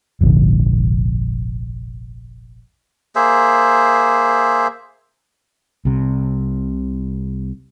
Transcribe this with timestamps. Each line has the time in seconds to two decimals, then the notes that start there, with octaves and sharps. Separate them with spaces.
0.21 F1 A#1 G#2 D3
3.16 A#3 G#4 C5 E5
5.85 C2 C3